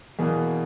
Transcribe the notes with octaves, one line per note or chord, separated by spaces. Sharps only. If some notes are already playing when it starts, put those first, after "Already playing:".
E2 B2 A#3 G#4